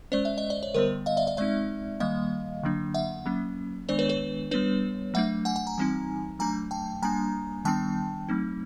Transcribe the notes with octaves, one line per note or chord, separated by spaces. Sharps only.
G#3 C#4 C5 D5
E5
D#5
D5
C#5
D3 G3 B3 A#4 C5
D#5 F5
D5 E5
D5 E5
G#3 C4 D#4 D5 E5
D#3 G3 A#3 D#5 F5
D3 F#3 A#3 D4
E5 F#5
F#3 A#3 C#4
D#3 G#3 B3 D4 C5 D5
B4 C#5
B4 C#5
G3 B3 D4 B4 C#5
F#3 A3 D4 E5 F#5
F#5 G#5
F#5 G#5
G#5 A#5
E3 G3 C4 D#4
F#3 A3 D4 G#5 A#5
G5 A5
G3 A#3 D4 G#5 A#5
D#3 G3 B3 D4 G5 A5
F#3 A3 C4 D#4